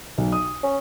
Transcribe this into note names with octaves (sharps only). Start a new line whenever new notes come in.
B1
D#6
C#4